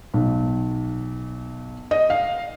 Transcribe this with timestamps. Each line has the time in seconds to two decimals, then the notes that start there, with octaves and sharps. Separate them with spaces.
0.14 B1
1.91 D#5
2.10 F5